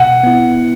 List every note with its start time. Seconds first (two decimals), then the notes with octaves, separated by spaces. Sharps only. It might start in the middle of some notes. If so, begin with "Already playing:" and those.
Already playing: B2 F#5
0.24 B3 E4